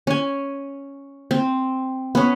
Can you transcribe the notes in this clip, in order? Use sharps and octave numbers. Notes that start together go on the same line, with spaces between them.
C#4 G#5
C4
B3 C#4